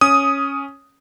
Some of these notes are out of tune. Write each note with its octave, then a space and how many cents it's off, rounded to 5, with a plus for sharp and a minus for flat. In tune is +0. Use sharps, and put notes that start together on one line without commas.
C#4 +0 D#6 +0